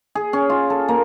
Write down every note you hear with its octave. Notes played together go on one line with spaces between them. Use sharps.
G#4
C#4
F4
A4
A#3